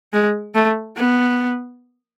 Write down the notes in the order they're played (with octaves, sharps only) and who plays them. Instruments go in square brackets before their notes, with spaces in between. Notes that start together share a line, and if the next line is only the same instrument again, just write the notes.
[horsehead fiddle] G#3
A3
B3